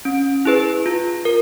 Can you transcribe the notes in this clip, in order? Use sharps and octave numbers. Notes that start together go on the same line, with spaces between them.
C#4
E4 G#4 B4
F4
A#4